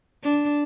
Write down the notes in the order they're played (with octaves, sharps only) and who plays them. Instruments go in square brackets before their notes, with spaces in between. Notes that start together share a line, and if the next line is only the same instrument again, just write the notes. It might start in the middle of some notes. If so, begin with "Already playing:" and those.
[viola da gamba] D4